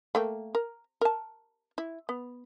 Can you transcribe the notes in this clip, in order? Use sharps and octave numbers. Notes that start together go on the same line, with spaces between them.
A3 A#3 G5
A#4
A#4 A5
E4
B3